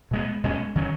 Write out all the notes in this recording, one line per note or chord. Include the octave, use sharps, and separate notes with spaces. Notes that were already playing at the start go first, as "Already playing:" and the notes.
B2 G#3 B3
B2 G#3 C#4
D#3 F#3 C#4